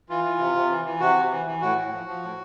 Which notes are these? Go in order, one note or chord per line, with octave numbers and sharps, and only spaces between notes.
E3 F4
E3
C3
C3
E3
E3
C3 F#4
C3
E3
E3
A2 F#4
A2
F3
F3
A2